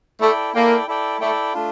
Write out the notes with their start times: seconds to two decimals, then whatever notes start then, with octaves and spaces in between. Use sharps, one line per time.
0.21 A3 E4 A4 D5 G5
0.54 A#3 E4 A4 D5 G5
0.87 E4 A4 D5 G5
1.20 A3 E4 A4 D5 G5
1.54 A3 D4 F4